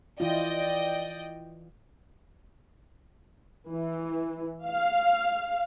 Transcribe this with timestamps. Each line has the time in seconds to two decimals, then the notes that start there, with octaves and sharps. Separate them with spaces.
0.20 E3 E4 F4 D5 D#5 G5
3.70 E3
4.65 F5